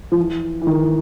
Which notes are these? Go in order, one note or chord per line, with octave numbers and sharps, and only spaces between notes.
F3
E3
E3
D#3